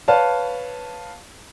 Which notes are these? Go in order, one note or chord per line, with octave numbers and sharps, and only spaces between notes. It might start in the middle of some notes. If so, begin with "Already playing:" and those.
B4 C#5 F5 A5